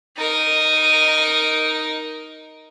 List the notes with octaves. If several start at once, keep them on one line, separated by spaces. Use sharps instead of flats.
D#4 A#4